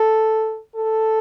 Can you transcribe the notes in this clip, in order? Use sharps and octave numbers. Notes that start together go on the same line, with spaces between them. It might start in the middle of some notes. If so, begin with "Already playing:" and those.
Already playing: A4
A4